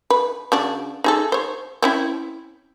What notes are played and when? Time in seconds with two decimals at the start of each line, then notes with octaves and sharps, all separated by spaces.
0.10 B4
0.52 C#3 D4 F#4
1.04 D#4 G#4 A4
1.32 C5 C#5
1.82 C4 C#4 E4